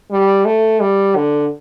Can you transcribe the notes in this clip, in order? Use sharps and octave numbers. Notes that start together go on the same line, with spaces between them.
G3
A3
G3
D3